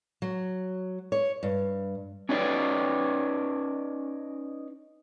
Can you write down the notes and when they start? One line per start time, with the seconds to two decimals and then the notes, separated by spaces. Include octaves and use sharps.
0.22 F#3
1.12 C#5
1.43 G2
2.29 C#4 D#4 B4 D5